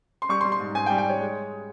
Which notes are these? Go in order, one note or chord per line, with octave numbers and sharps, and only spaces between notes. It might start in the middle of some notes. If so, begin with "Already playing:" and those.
C6
G3 C#6
C6
G3
C6
G#2
G#2 G#5
G5
G3
G5
G3 C#5
G#3